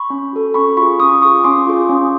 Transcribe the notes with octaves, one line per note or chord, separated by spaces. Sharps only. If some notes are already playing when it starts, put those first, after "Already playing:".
Already playing: B5 C#6
C#4
F#4 A4
C#4 B5 C#6
F4 G#4 B5 C#6
C#4 C#6 D#6
F4 G#4 C#6 D#6
C#4 C6 D6
F4 G#4
C#4